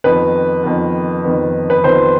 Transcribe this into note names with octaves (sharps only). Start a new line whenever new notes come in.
F2 D#3 B3 B4
F2 D#3 B3
F2 D#3 B3
B4
F2 D#3 B3 C5